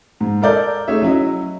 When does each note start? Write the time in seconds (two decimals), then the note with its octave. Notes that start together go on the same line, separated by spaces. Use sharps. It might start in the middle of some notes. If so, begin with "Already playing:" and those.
0.21 G#2
0.42 A4 A#4 D5 G6
0.88 A3 D#4 G#4 C#5 E5
1.02 F#3 C#4 E4 D#5